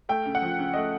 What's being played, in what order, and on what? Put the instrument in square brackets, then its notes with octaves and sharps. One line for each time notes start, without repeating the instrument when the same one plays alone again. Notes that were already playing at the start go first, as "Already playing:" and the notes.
[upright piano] A3 G5
C#3
F#5
F3
C#3
A3 D#5